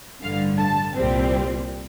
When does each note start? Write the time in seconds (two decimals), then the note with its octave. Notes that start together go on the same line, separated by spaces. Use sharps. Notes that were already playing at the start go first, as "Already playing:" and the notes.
0.22 A1 G2 D3 F5
0.58 A5
0.95 C2 A#2 G3 C4